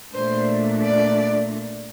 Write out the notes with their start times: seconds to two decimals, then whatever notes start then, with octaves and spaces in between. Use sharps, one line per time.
0.14 A#2 A3 D4 C5
0.82 D5